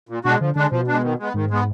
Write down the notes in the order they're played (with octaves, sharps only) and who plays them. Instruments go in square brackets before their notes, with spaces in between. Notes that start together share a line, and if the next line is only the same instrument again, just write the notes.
[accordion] A#2
[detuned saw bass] B2 [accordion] G#3 D4 F#4
[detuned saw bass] D3 [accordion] F3
[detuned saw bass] D3 [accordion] G#3 D4
[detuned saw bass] B2 [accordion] F3
[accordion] G#3 D4
D#3
G#3 B3
[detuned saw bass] G#2 [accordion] D#3
[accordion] G#3 B3